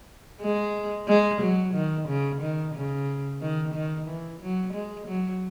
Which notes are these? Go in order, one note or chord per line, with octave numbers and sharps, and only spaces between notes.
G#3
G#3
F#3
D#3
C#3
D#3
C#3
D#3
D#3
E3
F#3
G#3
F#3